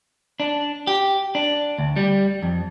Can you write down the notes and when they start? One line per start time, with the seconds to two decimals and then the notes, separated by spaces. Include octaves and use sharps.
0.40 D4
0.87 G4
1.35 D4
1.78 D2
1.96 G3
2.42 F2